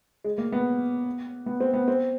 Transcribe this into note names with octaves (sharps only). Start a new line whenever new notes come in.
G#3
A#3
B3
B3
C4
B3
C4